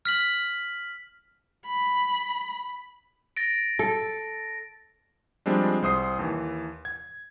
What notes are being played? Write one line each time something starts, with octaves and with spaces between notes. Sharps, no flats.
F6 B6 F#7
B5
A6 A#6 D7
A4
F3 G3 G#3 C4 D4
C2 C5 D#6 C7
D#2 E3
G#6